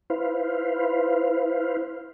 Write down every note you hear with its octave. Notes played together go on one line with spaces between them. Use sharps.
E4 B4 C5 F5